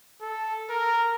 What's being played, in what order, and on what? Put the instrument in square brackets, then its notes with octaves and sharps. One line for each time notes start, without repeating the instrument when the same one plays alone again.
[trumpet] A4
A#4